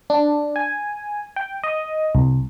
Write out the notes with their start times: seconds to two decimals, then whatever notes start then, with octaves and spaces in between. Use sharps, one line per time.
0.10 D4
0.56 G#5
1.36 G5
1.64 D#5
2.15 C2